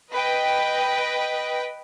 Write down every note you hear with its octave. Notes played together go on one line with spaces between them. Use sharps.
B4 D#5 G5